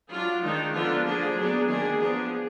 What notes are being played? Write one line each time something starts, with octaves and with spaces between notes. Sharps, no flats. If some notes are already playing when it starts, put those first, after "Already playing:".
F#3 D4 F4
D#3 G#3 D4 D#4
D3 F3 B3 D4 F4
F3 A#3 D4 G#4
F#3 B3 D4
D#3 A#3 D4 G#4
F3 B3 D4 G#4